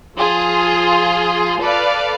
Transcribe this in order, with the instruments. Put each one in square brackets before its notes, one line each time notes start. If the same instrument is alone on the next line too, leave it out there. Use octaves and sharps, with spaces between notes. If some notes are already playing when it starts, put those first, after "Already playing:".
[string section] F3 F4 G#4 C6
A4 B4 D5 F5